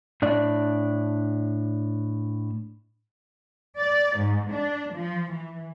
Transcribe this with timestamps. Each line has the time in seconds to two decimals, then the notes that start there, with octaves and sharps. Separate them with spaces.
0.22 A2 D4 D5
3.77 D5
4.16 G#2
4.52 D4
4.94 F3
5.32 E3